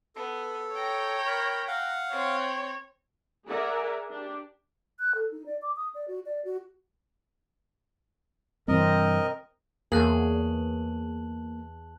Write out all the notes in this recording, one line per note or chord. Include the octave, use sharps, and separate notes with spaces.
B3 A4
C#5 G5 A#5
A#4 B5
F5 F#5
C4 C#5
G#4 A#4 D5 E5 F#5 G#5
D4 G4
F#6
A4
D#4
D5
D6
D#6
D5
F#4
D5
F#4
G2 E3 C4 A#4 D#5
E2 A#3 G#4 C#5 A5 F#6 F#7